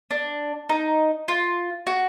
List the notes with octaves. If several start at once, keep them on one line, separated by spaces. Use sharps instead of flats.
D4
D#4
F4
F#4